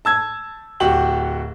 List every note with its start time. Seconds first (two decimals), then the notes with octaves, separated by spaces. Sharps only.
0.05 A5 E6 G#6
0.80 D1 F#4 G4 F#7